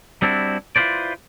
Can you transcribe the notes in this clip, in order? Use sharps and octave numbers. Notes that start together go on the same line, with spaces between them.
G3 C4 D4 E4 F#4
E4 F4 G#4 B4 C5 D5